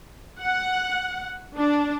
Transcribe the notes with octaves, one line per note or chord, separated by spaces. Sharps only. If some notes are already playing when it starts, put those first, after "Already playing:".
F#5
D4